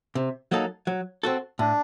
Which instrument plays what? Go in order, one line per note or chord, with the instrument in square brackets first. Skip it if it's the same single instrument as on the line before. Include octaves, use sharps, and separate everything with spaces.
[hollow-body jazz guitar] C3
F#3 A#3 D#4 A4
F#3
C4 F#4 A4
[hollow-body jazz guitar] A2 [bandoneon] D4